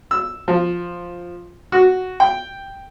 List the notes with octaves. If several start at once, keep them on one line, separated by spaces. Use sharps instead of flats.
E6
F3
F#4
G5